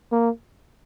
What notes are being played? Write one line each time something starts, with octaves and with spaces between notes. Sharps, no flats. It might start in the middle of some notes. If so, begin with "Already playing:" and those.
A#3